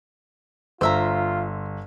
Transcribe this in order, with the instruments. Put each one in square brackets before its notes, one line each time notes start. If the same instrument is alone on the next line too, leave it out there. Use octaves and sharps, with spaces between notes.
[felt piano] G1 [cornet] F4 [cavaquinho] C5 E5 A#5